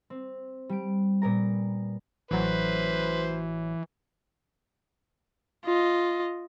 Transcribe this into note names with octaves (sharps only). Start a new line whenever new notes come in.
C4
G3 D7
A#2 B3 A#4 A#5
A1 E3 F#3 B4 C5
F4 D#5